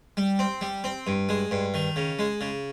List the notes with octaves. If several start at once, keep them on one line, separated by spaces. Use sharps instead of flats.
G3
C4
G3
C4
G2
G#3
G2
D#3
C#3
G#3
C#3